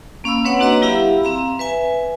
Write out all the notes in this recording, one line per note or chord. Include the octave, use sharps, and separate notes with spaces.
A#3 C#4 F5 B5 E6
C4 B4 C#5 F#5 C6 D#6
A#3 D4 F#4 B4 D#5 A#5
F#3 E4 G4 E5 F5 B5
C4 F5 A#5
B4 E5 G#5